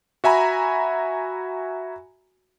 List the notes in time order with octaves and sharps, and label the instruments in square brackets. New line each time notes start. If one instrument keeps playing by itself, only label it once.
[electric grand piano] F#4 E5 G#5 A#5 B5